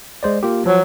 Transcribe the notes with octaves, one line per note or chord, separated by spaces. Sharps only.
G#3 C5 D5
A#3 F4 G4
F3 F#3